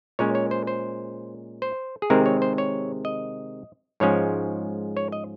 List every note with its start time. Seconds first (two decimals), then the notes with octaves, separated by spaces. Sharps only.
0.19 A#2 G#3 C#4 C#5
0.35 C#5
0.51 C5
0.67 C5
1.62 C5
2.02 G#4
2.10 C3 D#3 G#3 C4 A#4
2.26 C#5
2.42 C5
2.58 C#5
3.05 D#5
4.00 G#2 F3 G#3 C#4 C#5
4.97 C#5
5.12 D#5